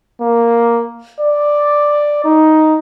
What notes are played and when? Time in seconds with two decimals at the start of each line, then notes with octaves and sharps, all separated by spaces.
0.21 A#3
1.21 D5
2.24 D#4